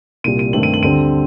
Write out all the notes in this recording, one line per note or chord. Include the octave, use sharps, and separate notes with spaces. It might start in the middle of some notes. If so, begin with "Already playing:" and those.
C2 A#2 G3 D#7
D#7
G2 D#3 A3 C4 F#7
D#7
F#7
D2 D3 G3 C4 D#7